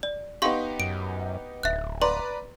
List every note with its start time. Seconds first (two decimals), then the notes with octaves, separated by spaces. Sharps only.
0.03 D5
0.42 B3 D#4 G4 F5 C6 C#6
0.80 F#2 D7
1.63 D1 E5 F#6
2.02 B4 D5 A#5 C6